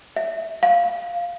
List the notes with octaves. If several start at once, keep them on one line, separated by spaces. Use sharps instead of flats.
E5
F5